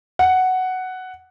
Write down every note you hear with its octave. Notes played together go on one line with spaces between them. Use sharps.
F#5